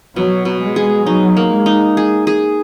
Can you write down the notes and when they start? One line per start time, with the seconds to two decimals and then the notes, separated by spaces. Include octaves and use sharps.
0.16 B2 F#3
0.45 B2
0.61 G#3
0.76 G#4
1.06 F#3 D#4
1.37 A#3
1.51 G#3
1.66 D#4
1.97 G#4
2.27 G#4